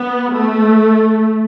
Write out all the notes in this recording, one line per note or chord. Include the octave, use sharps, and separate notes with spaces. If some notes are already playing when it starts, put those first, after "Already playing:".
Already playing: B3
A3